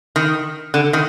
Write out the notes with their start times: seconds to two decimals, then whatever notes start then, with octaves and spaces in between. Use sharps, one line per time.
0.16 D#3
0.74 D3
0.93 D#3